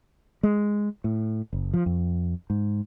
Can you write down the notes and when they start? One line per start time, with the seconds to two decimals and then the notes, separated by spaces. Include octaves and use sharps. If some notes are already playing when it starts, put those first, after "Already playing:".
0.43 G#3
1.04 A2
1.53 F#1
1.74 F3
1.86 F2
2.50 G#2